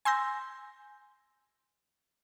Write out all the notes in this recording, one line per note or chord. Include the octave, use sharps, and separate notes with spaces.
G#5 C6 E6 G6 A#6